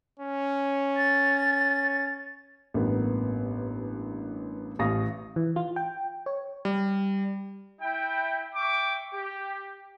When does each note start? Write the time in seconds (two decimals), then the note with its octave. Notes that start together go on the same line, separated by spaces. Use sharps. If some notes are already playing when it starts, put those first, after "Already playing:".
0.19 C#4
0.97 A6
2.74 A1 G2 A#3 B3
4.79 A1 F5 C#6 D#6 A#6
5.36 E3
5.56 F4
5.76 G5
6.26 C#5
6.65 G3
7.80 E4 G5
8.55 E5 G5 C#6 D6
9.13 G4